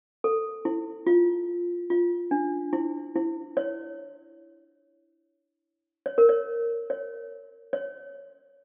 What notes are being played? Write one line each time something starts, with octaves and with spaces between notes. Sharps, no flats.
A4
E4
F4
F4
D4
E4
E4
C#5
C#5
A#4
C#5
C#5
C#5